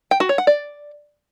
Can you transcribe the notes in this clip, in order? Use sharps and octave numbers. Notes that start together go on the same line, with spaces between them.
G5
F#4
C#5
F#5
D5